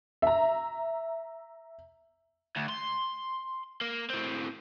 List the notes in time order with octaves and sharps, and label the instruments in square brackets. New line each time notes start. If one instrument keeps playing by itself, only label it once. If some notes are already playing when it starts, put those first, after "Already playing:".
[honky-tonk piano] E5 A#5
[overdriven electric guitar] D2
C6
A#3
A2 C4